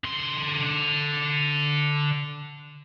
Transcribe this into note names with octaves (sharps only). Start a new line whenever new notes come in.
D3 C6